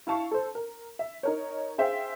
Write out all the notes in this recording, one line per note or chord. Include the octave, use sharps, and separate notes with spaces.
E4 F5 A5 C#6
A4 C5
A#4
E5
D#4 A#4 C#5
G#4 C5 E5 F5 G5